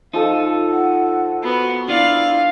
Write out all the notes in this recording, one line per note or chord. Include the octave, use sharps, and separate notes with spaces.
F3 D#4 A4 F5
F#5
B3 F#4
D4 E4 F4 D5 F5